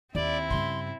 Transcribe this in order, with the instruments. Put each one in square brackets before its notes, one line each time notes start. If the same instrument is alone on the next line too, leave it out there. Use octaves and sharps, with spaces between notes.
[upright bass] D#2 [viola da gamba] C4 E4 [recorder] D5
[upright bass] G2 C#3 [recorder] C6